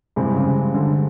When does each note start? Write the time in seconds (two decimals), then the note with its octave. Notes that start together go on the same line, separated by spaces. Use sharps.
0.16 G2 C3 E3 G#3 C4
0.36 C#3
0.74 D3